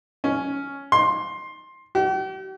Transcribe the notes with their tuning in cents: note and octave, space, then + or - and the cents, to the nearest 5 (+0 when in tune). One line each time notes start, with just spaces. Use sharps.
C#4 +5
C6 +15
G4 -45